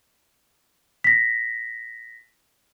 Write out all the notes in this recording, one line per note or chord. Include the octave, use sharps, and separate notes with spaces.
A#6 B6